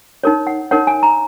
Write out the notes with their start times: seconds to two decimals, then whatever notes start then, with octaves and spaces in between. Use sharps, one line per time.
0.23 D#4 A#4 C#5
0.47 F#5
0.71 D#4 A#4 C#5 F#5
0.87 G#5
1.03 A#5